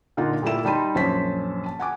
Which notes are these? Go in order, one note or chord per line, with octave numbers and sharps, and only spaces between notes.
A#2 D3 D#4 F4 F#5
A#2 G3 A3 A#3 E4 E7
G3 D#4 A5 B5 C6 D#7
A#1 F#2 C5 C#5 A5 B6
A5
F#5 G#5 D6